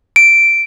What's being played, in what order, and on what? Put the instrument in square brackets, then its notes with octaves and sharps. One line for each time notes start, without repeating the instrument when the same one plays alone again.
[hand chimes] D7